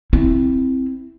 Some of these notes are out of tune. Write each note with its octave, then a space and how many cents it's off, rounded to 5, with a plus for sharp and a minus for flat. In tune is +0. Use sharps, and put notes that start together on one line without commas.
C4 +0 E4 +0